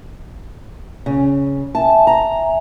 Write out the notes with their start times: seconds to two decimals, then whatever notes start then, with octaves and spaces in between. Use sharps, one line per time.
1.06 C#3
1.75 E5 G#5 A5
2.07 A#5